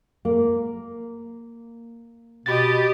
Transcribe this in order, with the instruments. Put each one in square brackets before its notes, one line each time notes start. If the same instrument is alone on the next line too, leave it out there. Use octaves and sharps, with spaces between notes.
[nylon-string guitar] A#3
[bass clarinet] B2 [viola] G4 D#5 [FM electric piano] B5 A6